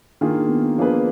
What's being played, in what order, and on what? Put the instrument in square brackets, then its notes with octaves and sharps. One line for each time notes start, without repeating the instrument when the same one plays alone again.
[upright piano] D#3 A#3 F4 G#4 [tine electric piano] D4
[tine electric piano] B3
[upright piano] F3 A#3 D4 G#4 B4